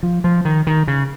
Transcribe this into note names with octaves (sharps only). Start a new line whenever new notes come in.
F3
F3
D#3
D#3
C#3